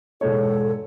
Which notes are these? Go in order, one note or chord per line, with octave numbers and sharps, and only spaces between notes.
E1 G#2 A4 C#5